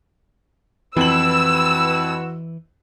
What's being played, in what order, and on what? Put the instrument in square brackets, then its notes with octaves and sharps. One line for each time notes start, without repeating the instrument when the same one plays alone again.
[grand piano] F2 F#7 [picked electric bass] E3 [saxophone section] E4 F#4 B4 [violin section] E6